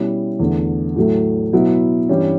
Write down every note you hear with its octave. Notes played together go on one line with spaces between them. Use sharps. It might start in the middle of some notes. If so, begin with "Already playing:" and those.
Already playing: B2 G3 C#4 E4
E2 D3 A3
A2 F#3 A3
B2 F#3 B3 E4
G2 E3 G3 C#4 E4